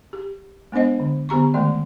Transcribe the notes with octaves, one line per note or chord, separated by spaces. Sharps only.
G4
G#3 B3 D4 C5 D#5
D3
D3 B3 G4 A#5 C#6
D#3 G#3 A3 D5